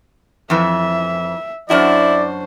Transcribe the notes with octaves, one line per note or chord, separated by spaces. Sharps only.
F2 E3 E5
F#2 D4 E4 F#4 C5 D5